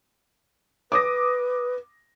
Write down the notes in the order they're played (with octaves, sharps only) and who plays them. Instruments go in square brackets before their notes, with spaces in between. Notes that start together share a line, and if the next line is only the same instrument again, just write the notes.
[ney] B4 [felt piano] D6 D#6 A#6